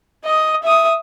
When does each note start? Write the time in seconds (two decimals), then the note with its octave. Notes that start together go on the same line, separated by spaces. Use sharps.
0.24 D#5 D#6
0.63 E5 D#6